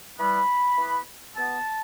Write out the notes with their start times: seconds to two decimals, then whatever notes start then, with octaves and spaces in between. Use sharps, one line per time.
0.19 E3 G3 B3 B5
0.78 E3 B3
1.36 B2 B3 A5